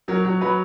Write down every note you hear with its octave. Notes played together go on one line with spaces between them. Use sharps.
F#3 A#4
F#3
F#3 B4